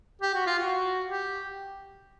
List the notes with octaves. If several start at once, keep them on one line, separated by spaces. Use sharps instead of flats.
G4
F#4
F4
F#4
G4